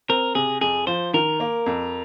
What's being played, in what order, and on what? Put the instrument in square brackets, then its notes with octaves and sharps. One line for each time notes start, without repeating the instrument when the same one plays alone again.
[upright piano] C4 [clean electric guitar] A#4
[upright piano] C3 [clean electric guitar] G#4
[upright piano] F2 [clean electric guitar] G#4
[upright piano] F3 [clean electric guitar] C5
[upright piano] D#3 [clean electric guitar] A#4
[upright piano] A#3
F2